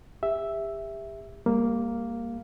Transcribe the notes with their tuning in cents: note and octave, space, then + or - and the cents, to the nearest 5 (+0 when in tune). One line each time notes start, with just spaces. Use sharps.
G4 +40 E5 +0
G3 +45 A#3 +0 F5 +0